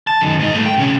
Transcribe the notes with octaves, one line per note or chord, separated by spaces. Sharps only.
A5
F#2 D#3
G#2 D#4
A3 A#3
G5
C3 C#4